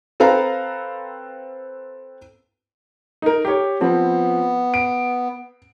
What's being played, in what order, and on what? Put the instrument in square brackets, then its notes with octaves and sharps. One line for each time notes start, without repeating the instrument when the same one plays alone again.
[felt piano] C4 A4 B4 F5 A#5
[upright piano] D#4 A#4
G4 C#5
[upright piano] F3 C4 [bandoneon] B3
[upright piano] D7